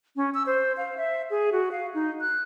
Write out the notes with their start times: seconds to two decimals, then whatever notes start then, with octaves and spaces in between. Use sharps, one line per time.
0.16 C#4
0.34 E6
0.46 C5
0.77 F5
0.97 E5
1.31 G#4
1.52 F#4
1.72 F5
1.94 D#4
2.21 F#6